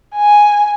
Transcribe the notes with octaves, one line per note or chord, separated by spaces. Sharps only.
G#5